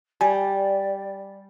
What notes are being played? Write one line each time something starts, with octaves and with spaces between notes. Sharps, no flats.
G3 D5 G#5